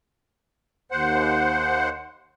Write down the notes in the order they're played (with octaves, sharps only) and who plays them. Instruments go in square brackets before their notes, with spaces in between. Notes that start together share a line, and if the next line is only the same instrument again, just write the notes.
[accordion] D#2 C5 F#5